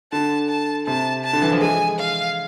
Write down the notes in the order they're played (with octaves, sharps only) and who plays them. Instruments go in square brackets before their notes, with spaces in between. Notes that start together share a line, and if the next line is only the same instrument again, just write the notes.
[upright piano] D3 [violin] A5
[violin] A5
[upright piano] C3 [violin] A5
[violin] A5
[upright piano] D3
E3
F3
[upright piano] G#3 [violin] G#5
[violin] F5